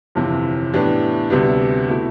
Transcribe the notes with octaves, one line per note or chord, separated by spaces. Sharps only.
G1 F2 C3 E3
A2 E3 B3 D4 G4
D2 C3 G3 B3 D4
B2 A3 E4